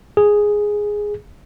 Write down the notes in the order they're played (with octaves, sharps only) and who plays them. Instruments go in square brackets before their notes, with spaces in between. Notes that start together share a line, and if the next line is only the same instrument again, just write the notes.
[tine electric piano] G#4